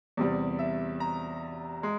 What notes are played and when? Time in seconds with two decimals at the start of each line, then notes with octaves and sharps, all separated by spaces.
0.17 E2 C3 G3
0.59 E5
1.00 A#5
1.83 G#3